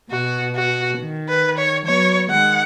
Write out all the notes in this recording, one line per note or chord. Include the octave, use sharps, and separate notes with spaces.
B2 F#4
F#4
D#3
B4
C#5
F#3 B3 C#5
D#3 G#3 F#5